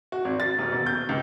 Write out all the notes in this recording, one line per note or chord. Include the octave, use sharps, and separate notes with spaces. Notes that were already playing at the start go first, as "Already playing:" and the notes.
F#4
G#1
A6
D#1
E1
G6
C#2